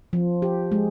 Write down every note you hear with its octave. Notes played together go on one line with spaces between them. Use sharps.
F3
G4
G#3